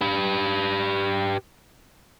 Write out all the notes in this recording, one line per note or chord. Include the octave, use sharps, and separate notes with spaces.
G4 B4